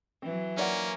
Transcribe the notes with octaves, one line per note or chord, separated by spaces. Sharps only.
E3 F#3 C4
A#3 C#4 D#4 D5 F#5